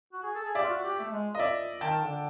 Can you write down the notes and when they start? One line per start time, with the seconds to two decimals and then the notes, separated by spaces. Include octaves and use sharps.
0.13 F#4
0.23 G#4
0.35 A4
0.45 G#4
0.55 G4 D5 E5
0.64 F4
0.69 F#4
0.84 G4
1.00 A3
1.11 G#3
1.35 D#5
1.39 D5 E5
1.81 D#3 G5 A5
2.02 D3